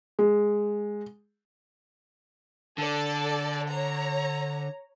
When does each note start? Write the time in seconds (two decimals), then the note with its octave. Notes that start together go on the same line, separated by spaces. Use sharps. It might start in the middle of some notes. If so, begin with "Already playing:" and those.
0.19 G#3
2.78 D3 A4 D5
3.70 C#5 A#5